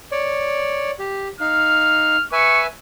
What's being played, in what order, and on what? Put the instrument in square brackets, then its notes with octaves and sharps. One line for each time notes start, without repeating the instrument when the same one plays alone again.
[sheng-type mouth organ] C#5 D5
G4
[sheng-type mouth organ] D#4 F5 [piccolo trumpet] F6
[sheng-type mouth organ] B4 E5 G#5 [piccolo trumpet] C#6